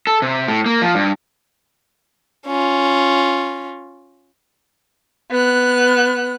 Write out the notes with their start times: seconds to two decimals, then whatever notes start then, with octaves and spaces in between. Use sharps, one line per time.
0.07 A4
0.22 C3
0.48 A2
0.66 A#3
0.82 F3
0.95 G2
2.47 C#4 F4
5.31 B3 F#6